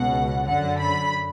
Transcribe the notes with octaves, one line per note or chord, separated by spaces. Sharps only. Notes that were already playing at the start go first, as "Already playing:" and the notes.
Already playing: C#2 B2 F#5
F#2 D3 F#5
B5